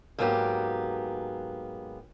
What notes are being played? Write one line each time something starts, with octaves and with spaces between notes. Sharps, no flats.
G#2 F#3 A#3 B3 F4 G4